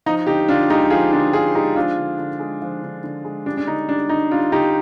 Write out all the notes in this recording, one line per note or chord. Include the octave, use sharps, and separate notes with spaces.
F3 D#4
D3 D#4 G4
D3 D4 F4
G#3 D#4 G4
F3 F4 G#4
D3 D4 F4
D3 F4 G#4
G#3 D#4 G4
F3 D4 F4
D3
D3
G#3
F3
D3
D3
G#3
G3 D4
D4
D3 D#4
G3 D4
D3 D#4
G3 D4 F4
D3 D#4 G4